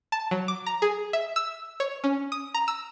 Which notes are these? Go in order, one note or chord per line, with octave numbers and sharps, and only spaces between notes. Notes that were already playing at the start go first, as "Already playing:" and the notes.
A5
F#3
D6
A#5
G#4
E5
E6
C#5
C#4
D#6
A#5
E6